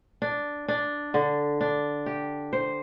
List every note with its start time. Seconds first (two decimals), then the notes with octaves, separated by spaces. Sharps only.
0.22 D4
0.68 D4
1.14 D3
1.61 D4
2.06 G4
2.53 C5